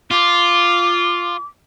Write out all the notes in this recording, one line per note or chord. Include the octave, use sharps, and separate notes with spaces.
F4 D6